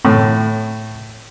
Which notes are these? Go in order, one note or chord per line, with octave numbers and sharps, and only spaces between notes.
A2